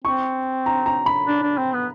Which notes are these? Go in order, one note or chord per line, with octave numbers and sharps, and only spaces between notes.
C4 C#6
A#5
A#5
B5
D4
D4
C4
B3